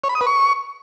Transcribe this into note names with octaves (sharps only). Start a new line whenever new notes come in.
C#5
B5
D#6
B4
C#6